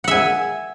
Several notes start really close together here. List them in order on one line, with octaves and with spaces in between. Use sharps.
F#5 E5 G#5